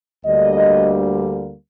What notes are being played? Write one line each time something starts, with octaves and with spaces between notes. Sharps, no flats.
D2 D3 G3 A#3 D#5